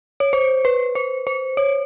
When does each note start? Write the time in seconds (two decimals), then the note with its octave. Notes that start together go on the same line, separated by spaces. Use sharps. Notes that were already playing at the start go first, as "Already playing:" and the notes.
0.20 C#5
0.33 C5
0.65 B4
0.95 C5
1.27 C5
1.57 C#5